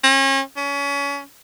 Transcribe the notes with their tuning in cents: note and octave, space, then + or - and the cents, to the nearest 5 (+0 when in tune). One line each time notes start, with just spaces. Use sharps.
C#4 -35
C#4 +30